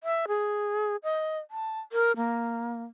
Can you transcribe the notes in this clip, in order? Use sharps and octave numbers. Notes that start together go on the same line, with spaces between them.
E5
G#4
D#5
A5
A#4
A#3